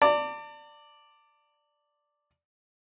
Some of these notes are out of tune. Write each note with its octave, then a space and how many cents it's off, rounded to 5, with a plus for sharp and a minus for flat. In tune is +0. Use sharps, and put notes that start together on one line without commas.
D5 +0 A5 +40